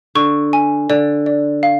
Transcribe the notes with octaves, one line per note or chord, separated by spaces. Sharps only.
D3 C#6
G#5
D3 D5
D5
F5